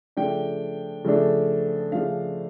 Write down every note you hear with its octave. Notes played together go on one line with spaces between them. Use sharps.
C#3 F3 A3 D4 G5
C#3 F3 A3 D4
C#3 F3 A3 D4 F5